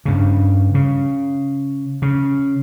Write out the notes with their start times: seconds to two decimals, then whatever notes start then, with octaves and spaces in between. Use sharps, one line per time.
0.05 G2 C#3
0.74 C#3
2.02 C#3